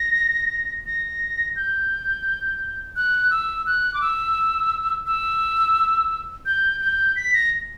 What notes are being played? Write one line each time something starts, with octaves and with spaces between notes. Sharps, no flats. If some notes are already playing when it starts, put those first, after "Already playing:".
Already playing: A#6
A#6
G6
F#6
E6
F#6
D6
E6
E6
G6
G6
B6
A#6